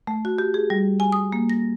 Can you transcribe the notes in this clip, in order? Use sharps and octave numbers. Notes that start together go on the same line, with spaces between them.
A3
F#4
G4
G#4
G3
G#5
D#6
A#3
A#6